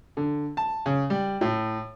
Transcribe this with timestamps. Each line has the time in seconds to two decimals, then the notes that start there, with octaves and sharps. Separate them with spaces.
0.17 D3
0.57 A5
0.86 C#3
1.10 G3
1.41 A2